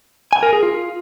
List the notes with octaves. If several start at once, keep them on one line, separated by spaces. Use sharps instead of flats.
G#5
A#4
G#4
F4